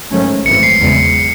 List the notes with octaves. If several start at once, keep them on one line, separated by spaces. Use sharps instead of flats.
G#2 D#3 F#3 A3 C#4
G#1 F#2 E3 A3 C4 C#7
C7
E2 C#3 G#3